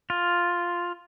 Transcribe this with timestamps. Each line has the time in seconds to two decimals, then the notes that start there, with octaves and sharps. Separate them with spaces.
0.10 F4